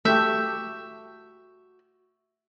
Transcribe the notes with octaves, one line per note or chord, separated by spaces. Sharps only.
A3 F#4 G4 E5 G6